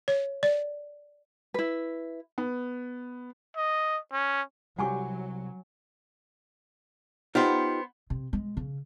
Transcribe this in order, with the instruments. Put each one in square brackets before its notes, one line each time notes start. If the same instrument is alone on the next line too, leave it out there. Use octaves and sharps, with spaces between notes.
[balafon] C#5
D5
[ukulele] E4 B4
[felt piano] B3
[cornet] D#5
C#4
[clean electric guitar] C2 [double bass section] F#3 [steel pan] G3 G4 [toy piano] F#5 G#5 C#6
[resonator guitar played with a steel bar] B3 C5 [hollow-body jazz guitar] D#4 F4 G4
[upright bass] C3
G#3
C#3